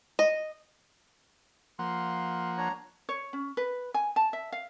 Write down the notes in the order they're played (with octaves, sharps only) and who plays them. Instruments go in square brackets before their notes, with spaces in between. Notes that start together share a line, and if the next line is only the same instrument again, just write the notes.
[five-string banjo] D#5
[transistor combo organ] F3 A#3 F#5 [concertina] C6
[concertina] D4 C#5 A#5
[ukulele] C#5
C#4
B4
G#5
A5
E5
F5